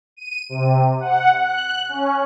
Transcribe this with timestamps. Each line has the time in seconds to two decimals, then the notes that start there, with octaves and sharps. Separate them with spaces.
0.17 D#7
0.49 C3
1.00 F#5
1.38 F#6
1.89 C#4